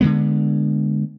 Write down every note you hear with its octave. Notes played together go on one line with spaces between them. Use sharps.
D3 F3 G#3 B3